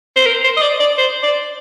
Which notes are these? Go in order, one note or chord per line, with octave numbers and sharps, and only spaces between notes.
C5
A#4
C5
D#5
D5
D5
C5
D5